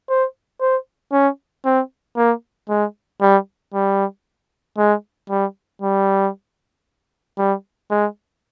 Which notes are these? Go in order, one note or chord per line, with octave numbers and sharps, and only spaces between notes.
C5
C5
C#4
C4
A#3
G#3
G3
G3
G#3
G3
G3
G3
G#3